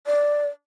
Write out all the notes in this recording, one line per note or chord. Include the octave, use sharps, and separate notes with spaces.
D5